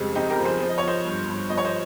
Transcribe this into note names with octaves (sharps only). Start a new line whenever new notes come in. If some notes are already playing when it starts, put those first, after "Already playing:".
Already playing: F2 C#3 G3 G#3
F2 D#4 G4
G4 A#4
F3
G#4 C5
F3
D#5
C#5
F3 C5 D#5
G2
G2
F3 D#5
C#5
C5 D#5